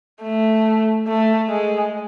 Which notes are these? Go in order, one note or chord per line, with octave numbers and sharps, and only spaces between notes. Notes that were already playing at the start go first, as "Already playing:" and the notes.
A3
A3
G#3